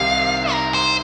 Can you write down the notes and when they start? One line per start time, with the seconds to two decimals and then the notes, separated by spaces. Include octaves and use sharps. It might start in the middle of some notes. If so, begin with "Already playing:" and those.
Already playing: C2 C3 D#3 F5
0.52 A#4
0.74 C5